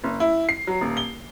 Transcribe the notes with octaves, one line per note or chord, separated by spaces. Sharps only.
F#1
E4
C7
F#3
D#1
G7